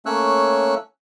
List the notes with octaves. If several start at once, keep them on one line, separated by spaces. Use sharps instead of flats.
A3 A#3 C#4 C#5 E6 F#6